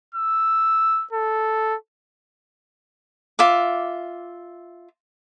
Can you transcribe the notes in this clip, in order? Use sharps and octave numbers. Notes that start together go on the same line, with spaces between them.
E6
A4
F4 E5 D6